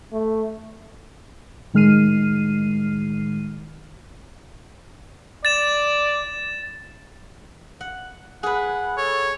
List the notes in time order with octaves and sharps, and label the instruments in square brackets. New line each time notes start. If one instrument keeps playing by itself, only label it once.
[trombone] A3
[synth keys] A2 D#3 G#3 F6 C7 D#7
[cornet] D5 [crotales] A6 E7
[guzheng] F#5
[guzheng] G#4 B4 [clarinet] F#5
[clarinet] A4 [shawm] C#5